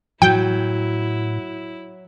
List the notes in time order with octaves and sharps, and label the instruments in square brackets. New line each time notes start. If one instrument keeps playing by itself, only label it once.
[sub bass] A2 [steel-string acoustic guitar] F#3 [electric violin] E4 [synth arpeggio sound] G5